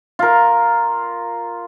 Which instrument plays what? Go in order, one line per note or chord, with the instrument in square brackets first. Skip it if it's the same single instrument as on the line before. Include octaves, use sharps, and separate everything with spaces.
[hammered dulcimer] F4 A#4